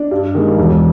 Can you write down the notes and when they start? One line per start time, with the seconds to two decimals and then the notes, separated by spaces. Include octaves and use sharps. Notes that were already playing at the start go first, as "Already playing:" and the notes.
Already playing: D4
0.11 G2
0.35 D#3 G#3
0.58 E1